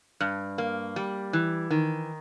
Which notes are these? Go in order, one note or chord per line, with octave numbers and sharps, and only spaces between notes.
G2
A#3
G3
E3
D#3